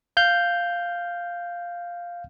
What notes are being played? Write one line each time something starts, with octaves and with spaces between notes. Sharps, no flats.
F5 F6 G6